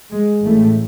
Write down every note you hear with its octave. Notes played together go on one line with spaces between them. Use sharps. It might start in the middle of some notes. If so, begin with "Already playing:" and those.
G#3
A1 A2 A3